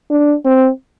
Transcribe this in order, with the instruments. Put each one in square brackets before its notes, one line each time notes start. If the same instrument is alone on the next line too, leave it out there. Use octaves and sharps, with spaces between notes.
[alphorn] D4
C4